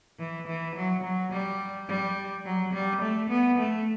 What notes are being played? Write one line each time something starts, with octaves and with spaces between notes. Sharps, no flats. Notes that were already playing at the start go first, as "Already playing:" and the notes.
E3
E3
F#3
F#3
G3
G3
F#3
G3
A3
B3
A3